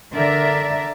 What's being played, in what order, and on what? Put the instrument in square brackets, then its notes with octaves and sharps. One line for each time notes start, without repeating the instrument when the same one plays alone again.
[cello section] D3 A#4 D5 E5